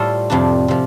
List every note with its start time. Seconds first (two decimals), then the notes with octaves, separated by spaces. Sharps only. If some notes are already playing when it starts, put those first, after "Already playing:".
Already playing: A2 G3 F4 A4 C5
0.30 F2 C3 F3 D4
0.68 C3 F3